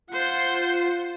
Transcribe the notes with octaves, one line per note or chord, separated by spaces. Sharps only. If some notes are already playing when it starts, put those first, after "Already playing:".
F4 C5 F#5